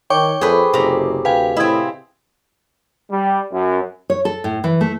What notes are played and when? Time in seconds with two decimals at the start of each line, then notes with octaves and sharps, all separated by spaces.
0.10 D#3 C#5 G5 C#6 D6
0.41 F2 G#4 A4 B4 C5
0.74 F#1 C3 A#5
1.25 D2 B4 F5 G5 G#5
1.56 A2 C4 E4 D#5 D#6 G#6
3.10 G3
3.52 F#2
4.10 C#5
4.25 A4
4.44 A2
4.64 E3
4.81 A3